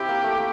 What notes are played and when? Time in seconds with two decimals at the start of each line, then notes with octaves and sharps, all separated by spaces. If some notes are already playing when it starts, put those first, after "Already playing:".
Already playing: C4 E4 G4
0.09 A#3
0.23 A3
0.37 A#3